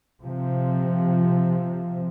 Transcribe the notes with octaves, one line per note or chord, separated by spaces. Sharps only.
C3 F3